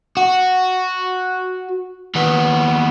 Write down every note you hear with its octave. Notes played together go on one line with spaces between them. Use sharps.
F#4
D#2 B3